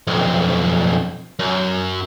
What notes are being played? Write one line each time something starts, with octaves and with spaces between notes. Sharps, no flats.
B1 F2
F#2